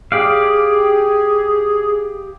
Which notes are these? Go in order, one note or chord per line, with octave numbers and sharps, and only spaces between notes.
G4 G#4 D5 F5